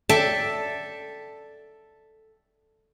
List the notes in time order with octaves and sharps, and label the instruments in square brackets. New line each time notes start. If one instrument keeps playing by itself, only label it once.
[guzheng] A4 D5 E5 G5 A5